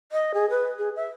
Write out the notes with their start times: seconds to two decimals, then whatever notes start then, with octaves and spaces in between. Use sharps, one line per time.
0.12 D#5
0.34 G#4
0.50 B4
0.78 G#4
0.96 E5